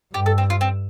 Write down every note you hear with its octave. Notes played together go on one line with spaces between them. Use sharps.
G2 G4
A4
C4
F4
C4